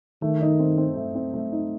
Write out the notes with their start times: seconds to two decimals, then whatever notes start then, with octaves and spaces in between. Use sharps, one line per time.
0.22 D#3 A3
0.41 D#4
0.59 C4
0.77 C4
0.96 A3
1.15 C4
1.34 A3
1.52 D#4